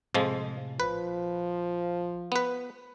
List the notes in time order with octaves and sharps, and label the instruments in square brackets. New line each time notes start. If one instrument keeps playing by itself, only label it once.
[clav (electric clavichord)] F2 F3 G#3 [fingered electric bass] A2 C3
[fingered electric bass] A#1 [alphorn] F3 [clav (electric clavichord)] B4
[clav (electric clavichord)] B3 B4